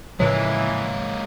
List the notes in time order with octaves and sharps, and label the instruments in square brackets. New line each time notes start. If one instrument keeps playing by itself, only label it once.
[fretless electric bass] A2 C#3 F3 [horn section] E3 [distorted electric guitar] G#3 A#3 [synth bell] C#5